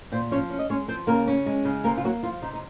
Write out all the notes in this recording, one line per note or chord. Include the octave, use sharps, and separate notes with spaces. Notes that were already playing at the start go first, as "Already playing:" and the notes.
A#2 C4 C5
F3 C#4 C#5
C#4
D#5
G#3 C#4 C#5
F3 C4 C5
C#3 A#3 A#4
C#4
G#3
C#3
C3 A#3 A#4
F4
F#3 A#3 F#4
F3 F4
C3 D#4
D#4